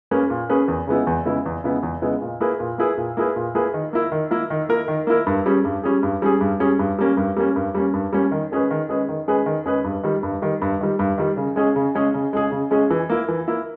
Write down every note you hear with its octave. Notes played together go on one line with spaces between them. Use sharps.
A#3 C#4 G#4 B4
A#2
A#3 C#4 G#4 B4
E2
C#3 G#3 B3 E4
E2
C#3 G#3 B3 E4
E2
C#3 G#3 B3 E4
E2
C#3 G#3 B3 E4
A#2
A#3 E4 G#4 B4
A#2
A#3 E4 G#4 B4
A#2
A#3 E4 G#4 B4
A#2
A#3 E4 G#4 B4
D#3
A#3 E4 A#4
D#3
A#3 E4 A#4
D#3
A#3 E4 A#4
D#3
A#3 E4 A#4
G2
G3 C#4 G#4
G2
G3 C#4 G#4
G2
G3 C#4 G#4
G2
G3 C#4 G#4
G2
G3 A#3 C#4
G2
G3 A#3 C#4
G2
G3 A#3 C#4
G2
G3 A#3 C#4
D#3
G#3 C#4 G#4 B4
D#3
G#3 C#4 G#4 B4
D#3
G#3 C#4 G#4 B4
D#3
G#3 C#4 G#4 B4
G2
D#3 G3
G2
D#3 G3
G2
D#3 G3
G2
D#3 G3
C#3
G#3 C#4 G#4
C#3
G#3 C#4 G#4
C#3
G#3 C#4 G#4
C#3
G#3 C#4 G#4
E3
A#3 E4
E3
A#3 E4